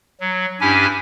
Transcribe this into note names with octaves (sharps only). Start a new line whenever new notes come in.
F#3
G2 C#4 D4 E4 G4 G#5